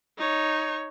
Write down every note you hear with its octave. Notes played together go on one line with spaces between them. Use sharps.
D#4 C#5